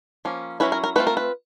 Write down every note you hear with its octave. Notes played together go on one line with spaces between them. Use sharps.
F3 A#3 C#4
F#3 A3 C#4 E4 B4
A#4
A#4
A3 C4 F4 B4
A#4
B4